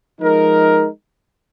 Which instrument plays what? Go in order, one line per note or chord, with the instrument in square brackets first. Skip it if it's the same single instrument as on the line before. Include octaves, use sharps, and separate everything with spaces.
[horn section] F3 G#3 D#4 A#4